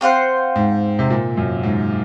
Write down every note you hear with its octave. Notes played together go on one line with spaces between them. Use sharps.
C4 F4 C5 F#5
G#2
C3
A#2
F#2
G#2